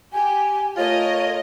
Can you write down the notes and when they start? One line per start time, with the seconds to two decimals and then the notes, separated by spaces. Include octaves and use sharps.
0.13 G4 G#5
0.77 A3 F4 A#4 C#5 D#5